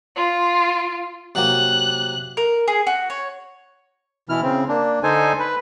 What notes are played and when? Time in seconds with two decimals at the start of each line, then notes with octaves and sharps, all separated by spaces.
0.16 F4
1.35 C3 F#3 A#3 F#6
2.37 A#4
2.68 G#4
2.87 F#4
3.10 C#5
4.29 B2 E3 E4 F6
4.42 C#3 C4
4.69 A#3 D4
5.03 D3 D#4 A4 C5 G#5
5.39 B4